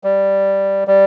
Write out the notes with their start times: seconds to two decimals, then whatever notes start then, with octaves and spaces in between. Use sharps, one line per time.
0.04 G3
0.88 G3